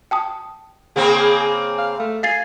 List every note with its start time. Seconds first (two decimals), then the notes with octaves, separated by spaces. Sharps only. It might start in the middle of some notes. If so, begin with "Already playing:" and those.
0.11 G5 A5 D#6
0.96 C#3 A#3 C4 G#4
1.78 F5
2.00 A3
2.23 F5 G#5 A6 C7